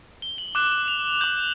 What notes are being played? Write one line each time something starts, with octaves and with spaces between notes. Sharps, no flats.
G7
F#7
D6 F#6 E7
F7
D6 G6 F#7